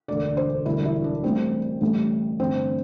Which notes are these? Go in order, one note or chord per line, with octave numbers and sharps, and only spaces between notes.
E1 D2 D3 D5
C5
E1 D2 D3 G3 E4
E4
D4
A1 A2 G3 C4
A1 A2 G3
A1 G2 D3 C4